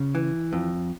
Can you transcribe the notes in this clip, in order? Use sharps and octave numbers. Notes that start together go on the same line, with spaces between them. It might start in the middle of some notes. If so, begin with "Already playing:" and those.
Already playing: C#3 F4
E3
F2